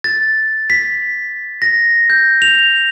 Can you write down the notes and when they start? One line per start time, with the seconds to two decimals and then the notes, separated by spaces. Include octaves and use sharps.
0.04 A6
0.70 B6
1.62 A#6
2.10 G6
2.42 F7